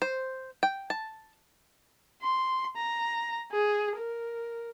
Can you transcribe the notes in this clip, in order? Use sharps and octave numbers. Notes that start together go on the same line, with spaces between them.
C5
G5
A5
C6
A#5
G#4
A#4